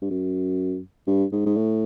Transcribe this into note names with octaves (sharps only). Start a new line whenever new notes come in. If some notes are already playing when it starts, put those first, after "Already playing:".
G2
F#2
G2
G#2
G#2
A2